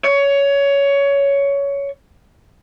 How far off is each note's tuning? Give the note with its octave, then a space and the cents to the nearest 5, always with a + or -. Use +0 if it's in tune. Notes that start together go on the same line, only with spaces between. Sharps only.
C#5 +15